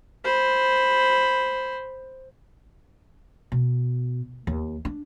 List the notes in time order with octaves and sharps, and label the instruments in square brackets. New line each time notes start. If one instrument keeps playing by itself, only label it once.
[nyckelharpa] C5 B5
[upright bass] B2
D#2
D4